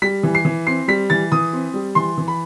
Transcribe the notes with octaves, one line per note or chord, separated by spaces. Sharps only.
G3 B6
E3
C7
E3
C4 C7
G3 B6
E3 A6
E3 D#6
C4
G3
E3 C6
E3
B5